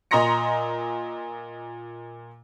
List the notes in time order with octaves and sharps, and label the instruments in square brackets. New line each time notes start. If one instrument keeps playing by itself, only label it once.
[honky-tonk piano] A#2 D#5 A#5 C6 A#6 C#7